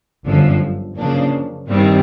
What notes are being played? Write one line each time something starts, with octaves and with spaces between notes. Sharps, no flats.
G1 F#2 D3 F3
F#2 C#3 F3 A#3 D4
G2 D#3 G3 C4